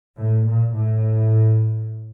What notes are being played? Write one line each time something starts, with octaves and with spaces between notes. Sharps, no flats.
A2
A#2
A2